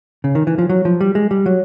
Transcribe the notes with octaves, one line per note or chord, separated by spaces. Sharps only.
C#3
D#3
E3
F3
F#3
F3
G3
G#3
G3
F#3